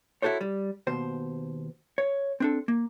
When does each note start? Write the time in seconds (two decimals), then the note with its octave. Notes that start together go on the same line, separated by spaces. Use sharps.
0.22 E4 F#4 A4 C5 C#5
0.41 G3
0.87 D#2 B2 C5
1.98 C#5
2.40 C4 D4 A4
2.68 A#3